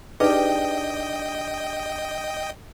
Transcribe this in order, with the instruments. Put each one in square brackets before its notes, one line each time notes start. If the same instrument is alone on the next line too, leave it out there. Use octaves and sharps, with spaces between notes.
[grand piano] D4 G4 [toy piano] D#4 G#4 B4 [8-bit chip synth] D#5 G5